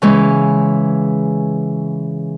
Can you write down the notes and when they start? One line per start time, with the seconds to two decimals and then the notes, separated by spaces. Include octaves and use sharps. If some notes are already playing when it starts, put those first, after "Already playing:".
0.02 C#3 E3 G#3 C#4